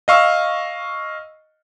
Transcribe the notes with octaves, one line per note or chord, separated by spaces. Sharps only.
D#5 F5 C#6 E6